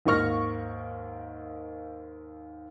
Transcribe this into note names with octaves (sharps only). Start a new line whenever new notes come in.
D#2 G#2 A#3 C#6 F6 A#6